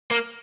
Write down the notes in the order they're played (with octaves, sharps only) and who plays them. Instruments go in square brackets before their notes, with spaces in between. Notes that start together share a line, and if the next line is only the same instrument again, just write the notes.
[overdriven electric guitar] A#3